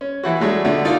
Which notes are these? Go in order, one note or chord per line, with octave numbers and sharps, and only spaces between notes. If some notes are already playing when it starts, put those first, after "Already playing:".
C#4
E3 E4 F#4
F#3 G#3 A3 D4
B2 D3 A3
D#4 F4 A#4 D5